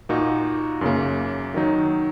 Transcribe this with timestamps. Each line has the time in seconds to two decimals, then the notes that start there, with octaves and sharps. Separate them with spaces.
0.09 A#2 A#3 D#4 F#4
0.81 F#2 C#3 A#3
1.54 D#3 F#3 D#4